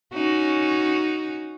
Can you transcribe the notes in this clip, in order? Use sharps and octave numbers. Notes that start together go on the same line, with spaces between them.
C#4 D#4 F#4